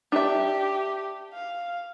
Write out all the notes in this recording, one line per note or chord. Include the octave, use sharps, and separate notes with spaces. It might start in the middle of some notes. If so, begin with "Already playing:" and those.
D4 G4 E5
F5